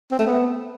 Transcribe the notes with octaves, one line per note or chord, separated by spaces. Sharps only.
C4
A3
B3